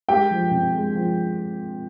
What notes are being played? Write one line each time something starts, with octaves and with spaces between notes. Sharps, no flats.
G#3 G4 G5
F3
C3
G#3
F3